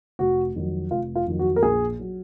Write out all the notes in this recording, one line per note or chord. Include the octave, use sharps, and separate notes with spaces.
F1 F#4
F2 D#3 F#3
F1 F4
F4
F2 D#3 F#3
F#4
A#4
A#1 G#4
F#3